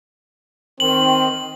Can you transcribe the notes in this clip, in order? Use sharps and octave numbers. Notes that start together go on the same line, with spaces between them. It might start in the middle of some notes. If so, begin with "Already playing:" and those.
D#3 C4 F#7